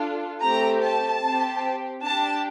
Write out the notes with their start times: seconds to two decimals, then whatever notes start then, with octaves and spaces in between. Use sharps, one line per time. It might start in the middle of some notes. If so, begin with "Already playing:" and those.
Already playing: D4 F4 A4
0.42 A3 C4 G4 A#5
0.83 A5
1.22 C4 G4
2.02 D4 G4 A5